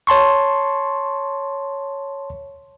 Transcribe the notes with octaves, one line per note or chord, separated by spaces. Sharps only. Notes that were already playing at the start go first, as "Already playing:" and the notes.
C#5 A5 C6 C#6